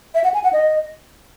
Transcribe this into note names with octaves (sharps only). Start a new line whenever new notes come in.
E5
F#5
G#5
F#5
D#5